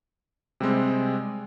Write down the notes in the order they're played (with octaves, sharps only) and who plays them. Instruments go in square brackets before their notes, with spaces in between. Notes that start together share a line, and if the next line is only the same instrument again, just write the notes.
[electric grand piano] C3 G3 G#3 C4